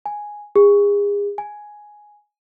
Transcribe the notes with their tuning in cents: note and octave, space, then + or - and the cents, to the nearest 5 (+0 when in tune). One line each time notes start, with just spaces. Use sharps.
G#5 +0
G#4 -35
G#5 +5